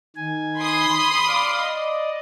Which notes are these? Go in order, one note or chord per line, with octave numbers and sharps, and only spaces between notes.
D#3 G#5
B5 C6 D#6
D5 F5 D6
D5 D#5